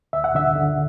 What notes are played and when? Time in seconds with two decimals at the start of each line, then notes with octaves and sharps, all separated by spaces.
0.13 D2 E5
0.24 F#5
0.35 D3 E5
0.55 D3